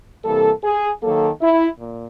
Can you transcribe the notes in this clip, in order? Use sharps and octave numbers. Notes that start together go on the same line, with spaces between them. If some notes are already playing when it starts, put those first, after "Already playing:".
C3 E3 G3 A#3 A4
G#4
D#3 F#3 A#3 A4
E4
A#2